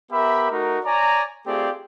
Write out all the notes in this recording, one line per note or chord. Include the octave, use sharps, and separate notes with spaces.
B3 G4 A#4 E5 B5
A3 D#4 F#4 A#4
C#5 D5 G#5 A#5
A3 C4 F4 G4 G#4 D5